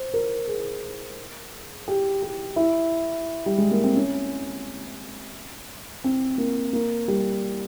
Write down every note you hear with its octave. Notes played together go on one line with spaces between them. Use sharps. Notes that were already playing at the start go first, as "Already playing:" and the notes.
Already playing: C5
A#4
G#4
G4
G4
E4
G3
G#3
A#3
C4
C#4
C4
A#3
A#3
G3